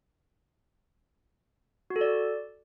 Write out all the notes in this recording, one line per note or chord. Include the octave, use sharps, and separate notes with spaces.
F#4
A4
D5